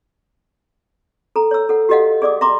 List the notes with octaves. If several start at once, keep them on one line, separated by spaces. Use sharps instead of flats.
A4 A#5
C#5 E6
A4 F#5
F#4 G4 A4 D#5 F5 F#5
G#4 D5 D6 D#6
E5 A#5 C6 D6